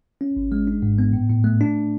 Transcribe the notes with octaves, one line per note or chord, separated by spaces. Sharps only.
C#4
G#1
G#3
D4
G#2
B3
A2
A2
A3
D4